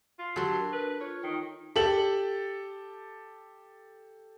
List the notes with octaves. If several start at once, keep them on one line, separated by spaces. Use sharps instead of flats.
F4
F#3 G4 A4 C6
D4 A#4
B4
F4 C#5
D#3 G5
G4 A4 F#7